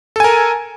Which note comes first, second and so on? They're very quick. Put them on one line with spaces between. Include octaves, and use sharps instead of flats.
A4 G#5 A#4